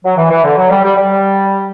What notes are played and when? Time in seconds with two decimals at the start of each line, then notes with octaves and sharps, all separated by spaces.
0.04 F#3
0.17 E3
0.30 E3
0.44 D3
0.57 F#3
0.70 G3
0.83 G3
0.96 G3